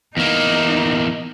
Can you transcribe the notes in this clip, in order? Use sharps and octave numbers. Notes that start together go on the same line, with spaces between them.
E2 A#3 D#4